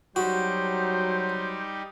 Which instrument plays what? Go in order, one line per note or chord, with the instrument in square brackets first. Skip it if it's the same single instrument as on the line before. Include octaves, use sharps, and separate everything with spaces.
[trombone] F#3 [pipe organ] G3 D#4 G4 [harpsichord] F#4 [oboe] C5